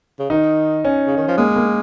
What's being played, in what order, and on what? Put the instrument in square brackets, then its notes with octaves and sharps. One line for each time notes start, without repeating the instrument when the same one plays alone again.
[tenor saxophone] C#3
[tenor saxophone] D#3 [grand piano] D#4
[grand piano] C#4
[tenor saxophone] C#3
D#3
F3
[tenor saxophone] G#3 [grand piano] A#3
[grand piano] A#3